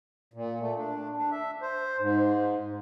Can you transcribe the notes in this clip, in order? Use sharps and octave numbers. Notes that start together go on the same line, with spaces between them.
A#2
A3
D4
D4
E5
C5
G#2